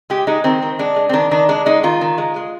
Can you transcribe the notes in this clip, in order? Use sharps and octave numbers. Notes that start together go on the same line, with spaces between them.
G#3 G4
G#3 D#4
D#3 C4
D#3
G#3 D4
G#3
C4
D#3 D4
D#3 D4
G#3 D4
G#3 D#4
D#3 F4
D#3
G#3
G#3